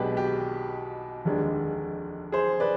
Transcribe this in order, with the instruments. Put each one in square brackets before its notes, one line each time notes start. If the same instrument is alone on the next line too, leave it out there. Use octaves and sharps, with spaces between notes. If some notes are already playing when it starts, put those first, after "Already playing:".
Already playing: [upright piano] B1 B2 G#3 D4 G4 B4
G4
F1 D#2 D3 G#3 D4
G#4 C5
B4 D5